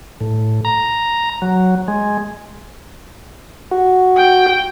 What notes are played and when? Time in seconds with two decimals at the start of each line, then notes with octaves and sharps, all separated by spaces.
0.21 A2
0.65 A#5
1.42 F#3
1.88 G#3
3.71 F#4
4.17 G5